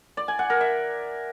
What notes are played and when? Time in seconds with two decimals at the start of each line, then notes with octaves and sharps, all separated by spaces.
0.17 D5
0.28 G#5
0.39 F#5
0.50 A#4
0.61 E5